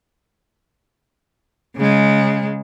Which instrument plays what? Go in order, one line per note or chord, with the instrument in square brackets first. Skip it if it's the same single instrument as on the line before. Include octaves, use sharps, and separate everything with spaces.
[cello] C#3 G#3